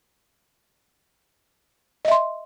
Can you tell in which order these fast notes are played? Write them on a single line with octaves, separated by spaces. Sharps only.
D#5 E5 C6